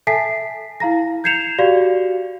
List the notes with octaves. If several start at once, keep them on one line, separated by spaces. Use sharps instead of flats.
A4 E5 G#5 A5 B6 C7
E4 F5 A#5 A#6
G6 G#6 C7 C#7 E7 F7
F#4 G4 D5 F5